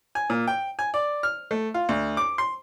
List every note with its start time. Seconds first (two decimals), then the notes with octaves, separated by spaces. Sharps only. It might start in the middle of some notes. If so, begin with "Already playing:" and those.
0.15 G#5
0.30 A#2
0.47 G5
0.79 G#5
0.94 D5
1.23 F6
1.51 A3
1.74 F4
1.89 D2
2.17 D6
2.38 C6